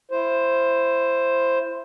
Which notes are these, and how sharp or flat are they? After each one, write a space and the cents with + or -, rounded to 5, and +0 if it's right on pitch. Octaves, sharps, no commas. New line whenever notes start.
E4 +25 C5 +5